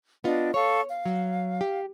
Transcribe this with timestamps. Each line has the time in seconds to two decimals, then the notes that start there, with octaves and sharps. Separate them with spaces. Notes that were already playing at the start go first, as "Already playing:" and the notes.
0.24 B3 D4 F4 D#5
0.54 A4 C#5 F5 C#6
0.89 F5
1.05 F#3
1.61 G4